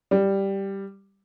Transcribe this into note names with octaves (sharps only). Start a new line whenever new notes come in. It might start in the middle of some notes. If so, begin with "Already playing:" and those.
G3